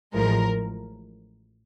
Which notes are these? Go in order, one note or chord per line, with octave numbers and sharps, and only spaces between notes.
A1 A2 F3 G#3 A#4